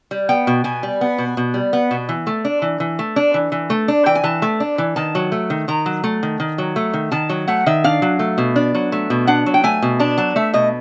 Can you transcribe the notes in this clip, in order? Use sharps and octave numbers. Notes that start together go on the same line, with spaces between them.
G3
B3 G5
B2
B2 G#5
G3
B3
B2
B2
G3
B3
B2
E3
A3
D4
E3
E3
A3
D4
E3
E3
A3
D4
E3 G5
G#5
E3 A5
A3
D4
E3
D#3 A5
F#3
A3
D#3
D#3 A#5
F#3
A3
D#3
D#3
F#3
A3
D#3
D#3 A5
F#3
A3 F#5
D#3 E5
D4 F5
F#3
A3
B2
D4
F#3
A3
B2
D4 F#5
F#3
G5
A3 G#5
B2
D4 A5
F#3 A5
A3 E5
B2 D#5